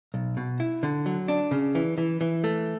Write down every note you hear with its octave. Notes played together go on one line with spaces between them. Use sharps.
B1
B2
E4
D3
F#3
D4
C#3
E3
E3
E3
A3